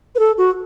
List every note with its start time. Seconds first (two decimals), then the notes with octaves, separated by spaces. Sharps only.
0.15 B4
0.19 A4
0.38 F#4